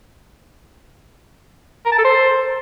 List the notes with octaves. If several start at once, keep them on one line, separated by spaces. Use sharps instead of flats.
A#4
A5
A4
C5